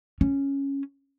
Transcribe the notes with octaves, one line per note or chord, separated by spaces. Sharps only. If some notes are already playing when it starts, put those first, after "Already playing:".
C#4